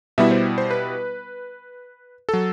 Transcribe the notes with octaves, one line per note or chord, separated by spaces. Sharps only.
B2 G3 B3 E4 E5
C5
C5
B4
F#3 A4